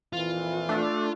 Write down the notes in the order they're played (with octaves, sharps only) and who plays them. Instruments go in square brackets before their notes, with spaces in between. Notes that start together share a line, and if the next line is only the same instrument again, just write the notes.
[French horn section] F2 A#2 E3 [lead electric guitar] F4
[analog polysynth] A3 D4